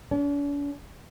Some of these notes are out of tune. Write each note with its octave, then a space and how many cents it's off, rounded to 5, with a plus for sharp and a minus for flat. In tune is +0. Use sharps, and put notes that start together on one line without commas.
D4 -45